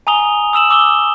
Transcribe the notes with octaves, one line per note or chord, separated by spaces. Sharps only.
G#5 A#5 D#6 F7 G7
D#6 E6 E7 F#7
D6 E6 G7